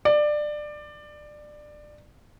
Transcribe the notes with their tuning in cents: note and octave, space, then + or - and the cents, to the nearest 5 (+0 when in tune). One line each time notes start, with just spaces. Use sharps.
D5 +20